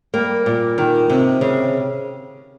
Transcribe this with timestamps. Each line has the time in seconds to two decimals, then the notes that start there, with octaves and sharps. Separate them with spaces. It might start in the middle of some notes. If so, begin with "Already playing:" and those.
0.14 G3 A#3
0.46 A#2
0.78 D#3
1.10 C3
1.41 C#3